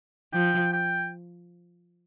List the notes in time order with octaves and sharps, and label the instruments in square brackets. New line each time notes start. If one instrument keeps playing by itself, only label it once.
[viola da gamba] F3 [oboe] G5
[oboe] G5